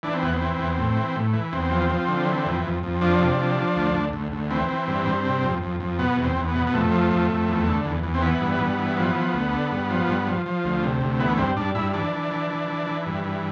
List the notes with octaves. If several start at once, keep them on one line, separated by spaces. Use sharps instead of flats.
E3 D4
C4
E2 B3
C4
E3
E2
A2
E3
A2
E3
E2 C4
F3
F3
D3
E3
F2
F2
F2
F3 D4
C3
F3
F3
D2
D2
D2
D2
E3 C4
E3
G2
G2
C3
F2
F2
F2
B2 B3
E2
C4
E2
B3
B2
B3
F2 A3
F3
F2
F2
E2
D3
E2
E2
C4
E3 B3
G2
G2
E3
F3
F3
D2
D3
G2
F3
G2
F3
F3
D2
C3
D2
E3 B3
G2 C4
G2 D4
G2 E4
E3 D4
E3
E3
E3
E3
E3
G2
E3